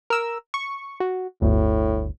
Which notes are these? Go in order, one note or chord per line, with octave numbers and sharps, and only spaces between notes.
A#4 E6
C#6
F#4
G1 D2 A2